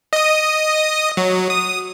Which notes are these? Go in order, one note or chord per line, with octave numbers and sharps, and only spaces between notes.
D#5 D#6
F#3
D#6